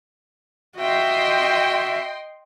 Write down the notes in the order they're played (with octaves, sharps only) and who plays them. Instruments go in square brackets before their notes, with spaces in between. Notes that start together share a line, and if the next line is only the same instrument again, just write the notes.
[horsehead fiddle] F#4 E5 [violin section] D#5 G5 C6